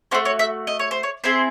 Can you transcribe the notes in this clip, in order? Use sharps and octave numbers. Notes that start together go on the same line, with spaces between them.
A3 C#4 F#4 C5
C#5
E5
D#5
C#5
C5
C#5
C4 E4 G#4 C5